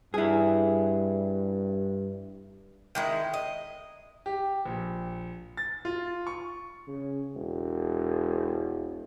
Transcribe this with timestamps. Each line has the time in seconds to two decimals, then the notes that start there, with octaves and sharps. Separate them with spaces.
0.14 G2 E4 G#4
2.95 D#3 G#3 E4
3.34 D#5
4.26 G4
4.65 A#1
5.57 A6
5.85 F4
6.27 C#6
6.88 C#3
7.35 E1